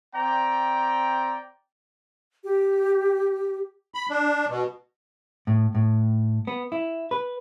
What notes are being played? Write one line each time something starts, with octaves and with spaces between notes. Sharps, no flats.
C4 D5 G5 A#5
G4
B5
D4
B2
A2
A2
B3
E4
B4